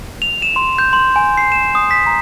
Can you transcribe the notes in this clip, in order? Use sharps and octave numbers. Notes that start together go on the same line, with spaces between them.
F7
E7
C6
G6
C6
G#5
C7
E7
D#6
B6
A#5